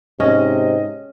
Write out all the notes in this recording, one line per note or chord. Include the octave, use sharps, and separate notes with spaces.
G#2 C3 C#4 D#5